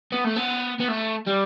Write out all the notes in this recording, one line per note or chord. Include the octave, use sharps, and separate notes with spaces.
B3
A3
B3
B3
A3
G3